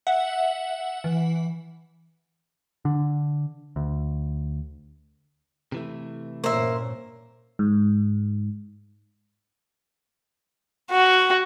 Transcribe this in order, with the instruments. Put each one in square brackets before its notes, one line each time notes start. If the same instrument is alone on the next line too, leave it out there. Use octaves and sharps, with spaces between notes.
[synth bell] E5 F#5
E3
[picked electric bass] D3
D2
[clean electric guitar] C3 E3 A3
[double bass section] G2 A#2 C#4 [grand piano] A#3 [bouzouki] C5 E5
[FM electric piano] G#2
[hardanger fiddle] F#4